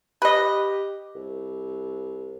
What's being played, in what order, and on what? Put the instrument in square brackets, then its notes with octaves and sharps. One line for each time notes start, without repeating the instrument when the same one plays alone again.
[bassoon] G4 [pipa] B4 D#5
[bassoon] C2